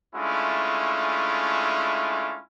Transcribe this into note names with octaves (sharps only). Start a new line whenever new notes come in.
G#3 A3 C#4 D4 E4 F4